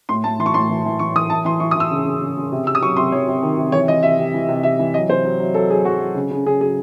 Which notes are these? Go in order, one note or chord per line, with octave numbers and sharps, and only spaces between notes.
A2 C6
A2 A5
E3 C6
C#6
A2 C6
E3
E3
E3 C#6
E3 D#6
E3 A5
E3 C6
E3 C#6
D#6
E3 E6
C#3
C#3
C#3
C#3
C3
C3 E6
D#6
F#3 C#6
C3 C6
F#3 C#5
C3
D#3
C3
E3 C#5
E3 D#5
C3 E5
C3
E3
C3
C3 E5
E3
F#3 D#5
C3 C5
F#3
F#3
F#3 A4
F#3 G#4
F#3 F#4
F#3
C#3
C#3
C#3 G#4
F#3 G#4